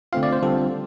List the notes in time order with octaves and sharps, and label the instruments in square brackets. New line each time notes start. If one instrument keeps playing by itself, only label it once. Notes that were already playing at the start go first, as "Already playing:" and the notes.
[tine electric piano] D3 A3 C4 F4 F5
D5
C5
D3 G3 C4 F4 A4